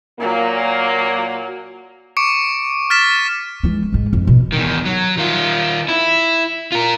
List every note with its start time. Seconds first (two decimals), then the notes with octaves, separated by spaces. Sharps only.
0.20 A#2 F#3 A#3
2.17 C#6 D6 C#7 D7
2.90 F6 A6 B6 E7
3.63 E3 G#3
3.92 G#2 G#3
4.13 F2
4.27 B2
4.52 E2 D#3
4.85 F#3
5.17 D#3 F4
5.88 E4
6.72 F4 A#4